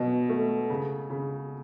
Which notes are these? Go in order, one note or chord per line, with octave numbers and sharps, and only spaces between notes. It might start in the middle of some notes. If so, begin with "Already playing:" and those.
Already playing: B2 F#3
A3
C#3
C#3